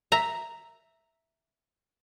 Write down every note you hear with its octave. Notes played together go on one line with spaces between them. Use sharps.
E5 A#5